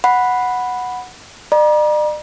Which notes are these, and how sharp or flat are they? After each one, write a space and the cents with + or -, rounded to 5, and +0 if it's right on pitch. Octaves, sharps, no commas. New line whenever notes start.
F#5 -5 B5 +0
D5 +45 A#5 +40